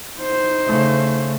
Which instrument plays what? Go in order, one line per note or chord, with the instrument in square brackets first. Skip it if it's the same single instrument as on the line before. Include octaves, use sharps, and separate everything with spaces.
[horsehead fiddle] D#4 C5
[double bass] C#3 A3